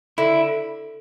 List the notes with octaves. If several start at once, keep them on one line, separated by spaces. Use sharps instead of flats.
D3 E4